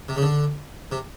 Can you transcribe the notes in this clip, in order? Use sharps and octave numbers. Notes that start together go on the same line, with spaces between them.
C3
C#3
D3
C3